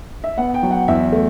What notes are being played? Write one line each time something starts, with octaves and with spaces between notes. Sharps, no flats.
E5
B3 F#5
G5
F#3
F#5
E2 E5
A3